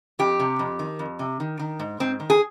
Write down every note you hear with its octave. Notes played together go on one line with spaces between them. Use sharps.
F2 G4
C3
F2
D#3
F2
C3
D#3
D#3
G#2
G#2 C4
D#3
G#4